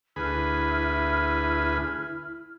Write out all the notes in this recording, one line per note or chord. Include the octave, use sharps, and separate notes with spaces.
D2 E4 G#4 B4 F6